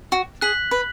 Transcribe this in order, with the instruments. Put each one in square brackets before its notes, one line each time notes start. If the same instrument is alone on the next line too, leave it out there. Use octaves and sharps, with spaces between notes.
[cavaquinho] F#4
[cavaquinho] G#4 [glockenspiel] F#6 B6 F#7
[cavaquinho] B4